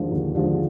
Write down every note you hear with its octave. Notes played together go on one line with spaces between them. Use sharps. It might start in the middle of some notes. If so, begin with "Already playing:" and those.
Already playing: D#2 D3 F3 G#3
D#2
D3 F3 G#3